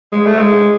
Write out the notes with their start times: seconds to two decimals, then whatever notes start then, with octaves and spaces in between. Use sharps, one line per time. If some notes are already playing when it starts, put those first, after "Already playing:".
0.12 G#3
0.26 A3
0.39 G#3